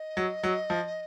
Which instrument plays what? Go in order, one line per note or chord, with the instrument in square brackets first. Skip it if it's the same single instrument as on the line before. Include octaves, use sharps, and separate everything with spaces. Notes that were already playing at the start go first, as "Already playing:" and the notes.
Already playing: [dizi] D#5
[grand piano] F#3
F#3
F3